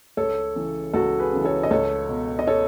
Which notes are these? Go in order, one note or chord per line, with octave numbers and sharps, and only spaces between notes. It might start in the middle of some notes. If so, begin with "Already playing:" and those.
C#2 A4 C#5
C#3 E3
C#2 F#4 A4
G#4 B4
C#3 E3
A4 C#5
D#5
C#2 A4 C#5
B2
D#5
A4 C#5